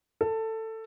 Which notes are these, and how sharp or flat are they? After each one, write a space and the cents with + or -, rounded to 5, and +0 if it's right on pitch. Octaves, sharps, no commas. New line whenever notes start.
A4 +15